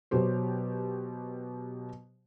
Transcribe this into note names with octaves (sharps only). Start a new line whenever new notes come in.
B2 F#3 G4 C5